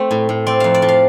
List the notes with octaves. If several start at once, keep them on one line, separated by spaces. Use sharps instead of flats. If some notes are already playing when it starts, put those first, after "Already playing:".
Already playing: A3 C4 A4 C5
A2
A2
C4 D5
F2 F5
D5
F3
F5